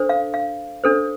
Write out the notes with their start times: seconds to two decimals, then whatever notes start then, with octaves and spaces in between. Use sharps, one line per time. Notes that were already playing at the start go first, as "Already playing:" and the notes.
Already playing: D4 A4 C5
0.09 F5
0.34 F5
0.84 D4 A4 C5